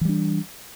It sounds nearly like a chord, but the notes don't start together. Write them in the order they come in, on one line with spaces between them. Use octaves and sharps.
E3 G3 D4